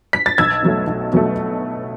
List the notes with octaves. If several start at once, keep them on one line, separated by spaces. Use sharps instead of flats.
B6
A6
B1 E6 G#6
B2 F#3 A3
B1
B2 F#3 A3